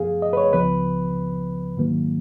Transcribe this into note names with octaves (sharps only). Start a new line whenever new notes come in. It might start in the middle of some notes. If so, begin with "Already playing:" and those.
Already playing: F#2 F3 B3 G#4 F5
D#5
B4
C#5
C#2 C#3 F3 B3 B4
G#2 D#3 F#3 A#3